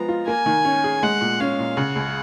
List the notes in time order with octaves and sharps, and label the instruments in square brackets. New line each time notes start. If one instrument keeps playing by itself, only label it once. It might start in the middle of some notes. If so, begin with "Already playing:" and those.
Already playing: [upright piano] F3 G#3 B3 [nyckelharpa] A#5
[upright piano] F4
[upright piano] A#3 [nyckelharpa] G#5
[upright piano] D#3
C#4
G#4
[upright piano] G#3 [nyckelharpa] F#5
[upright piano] A#2
[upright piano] C#4 [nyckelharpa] F5
[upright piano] A#2
[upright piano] C#3 [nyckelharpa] F#5
[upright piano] C#2